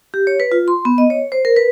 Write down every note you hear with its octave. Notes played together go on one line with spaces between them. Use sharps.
G4
C#5
B4
F4
C6
B3
D#5
C#5
C5
A#4
B4